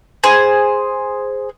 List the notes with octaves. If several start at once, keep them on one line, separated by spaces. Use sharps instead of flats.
G#4 C5